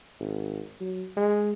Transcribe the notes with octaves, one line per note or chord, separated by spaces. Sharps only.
G#1
F#3
G#3